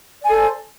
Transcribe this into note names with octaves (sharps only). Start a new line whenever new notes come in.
A4 C5 D5 G#5